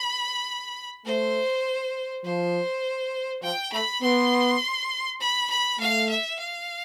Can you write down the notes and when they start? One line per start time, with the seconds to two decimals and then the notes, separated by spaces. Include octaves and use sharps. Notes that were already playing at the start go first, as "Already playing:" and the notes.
Already playing: B5
1.05 A3 C5
2.24 F3 C5
3.42 F3 G5
3.72 A3 B5
4.02 B3 C6
5.20 B5
5.50 B5
5.79 A3 F5
6.09 E5
6.39 F5